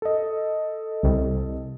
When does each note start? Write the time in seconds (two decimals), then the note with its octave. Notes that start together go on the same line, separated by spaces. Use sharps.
0.02 A4 D#5
1.03 C2